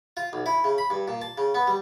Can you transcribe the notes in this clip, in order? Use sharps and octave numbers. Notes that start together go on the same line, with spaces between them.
F4
B1
E4
C#3
B5
G2
A#2
A5
C#3
B3
G3